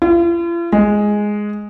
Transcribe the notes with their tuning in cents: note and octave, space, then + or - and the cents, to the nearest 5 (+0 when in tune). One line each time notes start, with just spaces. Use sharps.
F4 -45
G#3 +0